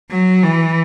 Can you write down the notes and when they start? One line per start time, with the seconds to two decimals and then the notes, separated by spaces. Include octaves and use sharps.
0.10 F#3
0.43 E3